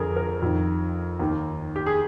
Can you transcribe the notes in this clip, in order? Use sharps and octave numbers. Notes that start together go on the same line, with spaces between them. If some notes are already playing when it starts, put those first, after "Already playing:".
Already playing: F2 D3 G#4 A#4
A#4
F2 D#3
D#2 D#3
G4
G#4